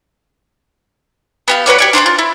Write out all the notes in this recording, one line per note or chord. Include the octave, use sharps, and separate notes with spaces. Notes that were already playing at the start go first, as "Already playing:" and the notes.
B3 G4 F5
F#4 B4 C#5 D5
G4 C#5 D5
D4 C5 C#5 D6
F4
E4